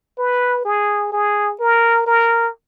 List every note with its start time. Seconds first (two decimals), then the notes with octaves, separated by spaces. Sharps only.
0.18 B4
0.65 G#4
1.12 G#4
1.60 A#4
2.06 A#4